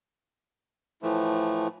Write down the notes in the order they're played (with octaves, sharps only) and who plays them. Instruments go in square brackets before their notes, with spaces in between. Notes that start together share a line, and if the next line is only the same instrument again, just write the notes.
[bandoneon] A2 E3 F3 A3